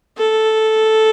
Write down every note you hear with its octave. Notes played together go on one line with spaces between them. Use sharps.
A4